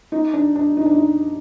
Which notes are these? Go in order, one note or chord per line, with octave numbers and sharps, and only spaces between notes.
D#4
D4
D4
D#4
D4
D#4